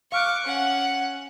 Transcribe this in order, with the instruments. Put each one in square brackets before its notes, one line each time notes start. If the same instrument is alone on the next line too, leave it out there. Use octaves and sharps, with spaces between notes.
[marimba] F5 F6 F#6 [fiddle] C#6 D6
[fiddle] C#4 F#5